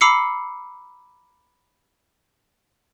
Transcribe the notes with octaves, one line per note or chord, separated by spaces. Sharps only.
A#5 B5 D6 E6 C7 C#7